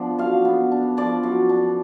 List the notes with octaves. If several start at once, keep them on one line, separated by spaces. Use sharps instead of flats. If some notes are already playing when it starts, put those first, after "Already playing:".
Already playing: F3 B3 D4 D5
F#2 F5
B3
D4
F3 D5
F#2
D4